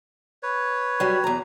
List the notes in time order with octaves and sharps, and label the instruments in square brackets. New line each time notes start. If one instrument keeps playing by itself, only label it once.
[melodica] B4 C#5
[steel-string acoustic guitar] F#3 G3
E2 A#5